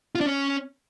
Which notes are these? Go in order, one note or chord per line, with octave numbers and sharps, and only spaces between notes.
F4
D4
C#4